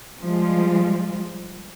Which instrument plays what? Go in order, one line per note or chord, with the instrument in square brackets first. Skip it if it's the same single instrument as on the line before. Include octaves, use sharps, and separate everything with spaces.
[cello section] F3 G3 G#3 F4